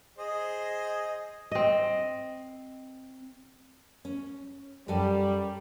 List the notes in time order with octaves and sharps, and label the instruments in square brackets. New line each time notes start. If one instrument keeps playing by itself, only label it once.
[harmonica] G#4 C5 D#5
[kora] C4 D#5
[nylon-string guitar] C#4
[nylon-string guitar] F#2 A4 G#5 [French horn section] G3